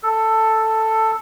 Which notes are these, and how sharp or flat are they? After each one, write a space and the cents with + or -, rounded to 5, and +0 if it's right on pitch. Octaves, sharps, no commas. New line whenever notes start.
A4 +10